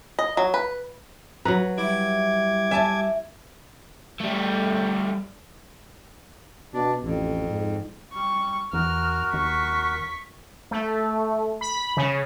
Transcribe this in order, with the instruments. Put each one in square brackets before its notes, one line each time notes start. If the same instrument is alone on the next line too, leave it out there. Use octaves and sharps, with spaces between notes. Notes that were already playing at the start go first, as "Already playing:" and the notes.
[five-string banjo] D#5
F#3
B4
[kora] F#3 B4 [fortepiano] A#5
[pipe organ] G3 D6 G#6 [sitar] E4
[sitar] E5 [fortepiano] G#5 A5
[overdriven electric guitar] G3 A3
[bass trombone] B2 [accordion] D4
[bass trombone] A1 [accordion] F2
[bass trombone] G#2
[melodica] G3 [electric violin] C#6
[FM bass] E2 [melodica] F#4 A#4 [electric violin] F6
[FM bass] D#2 [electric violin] C#6 B6
[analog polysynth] A3
B5
C#3